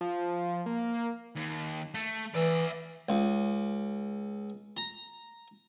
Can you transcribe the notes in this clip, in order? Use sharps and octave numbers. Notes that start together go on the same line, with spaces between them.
F3
A#3
D#2
A3
E3 D5 E5
C#2
A#5